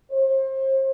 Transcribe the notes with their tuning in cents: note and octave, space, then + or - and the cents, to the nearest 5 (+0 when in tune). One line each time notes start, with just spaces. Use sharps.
C5 +35